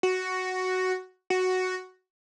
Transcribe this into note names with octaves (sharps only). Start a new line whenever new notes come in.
F#4
F#4